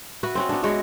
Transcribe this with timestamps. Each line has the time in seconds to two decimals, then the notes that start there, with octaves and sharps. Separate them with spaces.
0.23 F#4 B4 E5
0.35 C4 C#4 F#4
0.49 B3 D4
0.63 G#3 F#4 C#5 E5